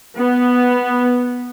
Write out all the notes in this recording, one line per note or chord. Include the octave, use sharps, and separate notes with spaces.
B3